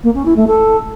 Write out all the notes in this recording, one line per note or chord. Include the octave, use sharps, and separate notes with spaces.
A#3
C#4
E4
A3
A4